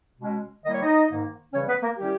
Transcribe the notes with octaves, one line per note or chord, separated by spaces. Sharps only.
B2 G#3 C#4
D#3 G3 A#3 E4 D#5
C#5
D#4 D#5
G#2 D#3 A#3 D#4
C#3 E3 G3 C#4 C#5
B3 B4
A#3 A#4
D#3 G3 C#4 E4 G4